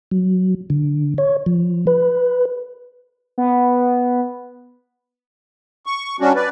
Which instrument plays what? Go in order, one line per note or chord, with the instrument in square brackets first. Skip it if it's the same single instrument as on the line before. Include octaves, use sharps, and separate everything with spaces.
[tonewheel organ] F#3
D3
C#5
F3
B4
[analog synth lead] B3
[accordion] C#6
G3 C#4 D4 F#4
B4 D5